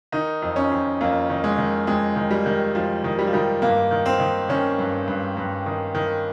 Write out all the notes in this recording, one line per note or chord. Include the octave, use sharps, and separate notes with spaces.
D#3 D#4
F2
C#4
F2
F2 A#3
D#3
G#3
D#3
F2 G#3
D#3
G3
D#3
F2 F3
D#3
G3
F3
D#3 G3
G2 A#3
D#3
C4
D#3
D#3 C#4
G2
G2
G2
D#3
D#3